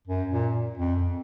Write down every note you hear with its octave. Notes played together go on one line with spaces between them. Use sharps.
F#2
A#2
F2